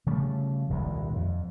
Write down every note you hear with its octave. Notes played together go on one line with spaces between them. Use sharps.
C#3 F3 G3 A3
D#1 C2 G2 G#3
F2